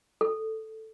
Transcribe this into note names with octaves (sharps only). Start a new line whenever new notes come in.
A4